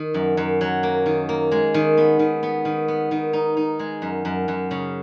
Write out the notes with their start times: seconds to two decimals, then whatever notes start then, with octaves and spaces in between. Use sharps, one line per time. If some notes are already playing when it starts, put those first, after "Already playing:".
Already playing: D#3
0.14 F#2
0.37 F#2
0.61 F#3
0.83 A#3
1.06 D#3
1.29 A#3
1.52 G#3
1.74 D#3
1.97 B3
2.19 D#3
2.43 B3
2.65 D#3
2.88 B3
3.11 D#3
3.33 D#4
3.57 D#4
3.79 G#3
4.02 F#2
4.25 F#2
4.48 F#2
4.71 C#3